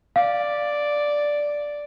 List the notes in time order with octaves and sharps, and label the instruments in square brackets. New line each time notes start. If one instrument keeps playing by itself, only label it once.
[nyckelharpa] D5 [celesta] F5